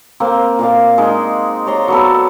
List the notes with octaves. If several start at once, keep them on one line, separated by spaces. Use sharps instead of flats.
A#3 C4
A#2 D5 F5
G#3 D#4
C#5 D5 A#5 C6
F#3 B3 A4